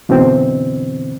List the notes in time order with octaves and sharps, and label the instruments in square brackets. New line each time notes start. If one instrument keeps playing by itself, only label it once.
[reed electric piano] F#2 B2 D3 E3 C4